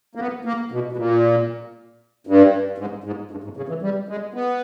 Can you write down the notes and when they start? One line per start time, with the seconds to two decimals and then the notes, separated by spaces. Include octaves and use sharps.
0.15 A#3
0.20 B3
0.45 A#3
0.72 B2
0.92 B2
0.97 A#2
2.27 G2
2.78 G#2
3.04 G#2
3.31 G2
3.44 G#2
3.57 C#3
3.69 E3
3.82 G3
4.09 G#3
4.34 B3